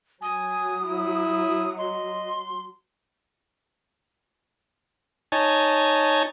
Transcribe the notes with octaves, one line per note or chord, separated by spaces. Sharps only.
F#3 G#5 D#6
E4
D#5 C6
D#4 C#5 G#5 A5